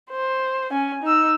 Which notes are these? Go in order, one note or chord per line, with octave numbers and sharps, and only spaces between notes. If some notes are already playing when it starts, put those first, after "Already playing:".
C5
C#4 G#5
D#4 E6